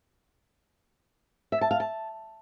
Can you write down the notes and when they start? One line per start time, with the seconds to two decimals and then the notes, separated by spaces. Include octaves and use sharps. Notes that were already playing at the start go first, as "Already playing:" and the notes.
1.52 E5
1.61 A5
1.71 F5
1.80 A5